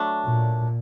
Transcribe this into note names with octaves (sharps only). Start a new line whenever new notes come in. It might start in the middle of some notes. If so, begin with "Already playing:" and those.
Already playing: F#3 A3 D4
A#2